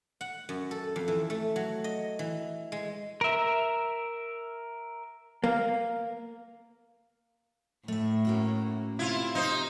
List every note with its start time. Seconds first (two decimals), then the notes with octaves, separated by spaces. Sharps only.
0.21 F#5
0.49 F#2
0.71 A4
0.96 F2
1.08 E3
1.30 A3
1.56 F#3
1.84 D#5
2.19 E3
2.72 G#3
3.21 A#4 E5
5.44 A#3
7.88 A2 A3 E5
8.25 A#3 C#4 F#4
8.99 C3 E4 F4
9.35 D#4 F4 G4 C5